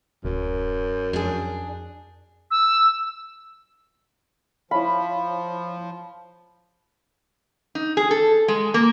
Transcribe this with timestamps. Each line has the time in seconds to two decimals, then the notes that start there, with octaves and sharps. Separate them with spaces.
0.25 D1 F#2
1.13 F2 D4 G#4
2.51 E6
4.71 F3 E4 C#5 F5 B5
7.75 D#4
7.97 G#4
8.11 A4
8.48 G#3
8.74 A#3